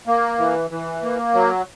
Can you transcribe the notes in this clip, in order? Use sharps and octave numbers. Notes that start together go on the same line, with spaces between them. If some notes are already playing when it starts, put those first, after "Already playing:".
A#3
E3
E3
A#3
F#3